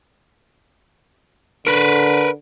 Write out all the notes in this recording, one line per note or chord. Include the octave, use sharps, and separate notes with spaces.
D3 A#4 B4